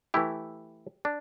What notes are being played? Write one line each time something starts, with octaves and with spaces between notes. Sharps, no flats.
E3 A3 E4 G4
D4